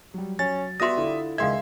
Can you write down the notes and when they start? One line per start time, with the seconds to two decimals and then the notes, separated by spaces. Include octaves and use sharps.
0.14 F#3 G3
0.39 F#3 C#4 A6
0.80 G3 B3 F#4 E5 C6 D#6 A#6
0.97 D3 E4 F4
1.38 C#2 D#3 G#3 G#4 E5 F5 C6 G#6